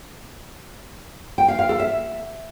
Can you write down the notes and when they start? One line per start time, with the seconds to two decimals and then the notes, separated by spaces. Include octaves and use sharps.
1.38 G5
1.48 F5
1.59 F5
1.69 A4
1.80 E5